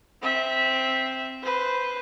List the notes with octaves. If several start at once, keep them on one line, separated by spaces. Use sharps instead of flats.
C4 E5
B4 C5